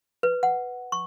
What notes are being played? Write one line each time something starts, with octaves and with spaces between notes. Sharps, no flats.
B4
F#5
C#6